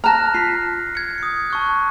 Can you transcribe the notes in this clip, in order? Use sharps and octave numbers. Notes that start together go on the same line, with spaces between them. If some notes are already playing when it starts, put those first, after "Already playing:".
A5 A#5 F6 F#6 A#6
F4 B6 C7
G#6 C#7
D#6 C#7
A5 C#6 F#6